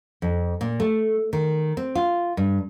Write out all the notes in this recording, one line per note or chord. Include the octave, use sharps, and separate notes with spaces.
F2
A#2
A3
D#3
C4
F4
G2